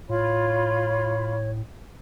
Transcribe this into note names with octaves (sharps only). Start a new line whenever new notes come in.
A2 F4 C#5 B5